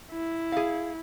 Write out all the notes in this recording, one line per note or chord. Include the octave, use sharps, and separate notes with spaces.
E4
G#4 F5